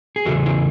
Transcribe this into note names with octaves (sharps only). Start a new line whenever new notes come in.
G#4
E2 C#3 E3 F#4 A4
E4 G#4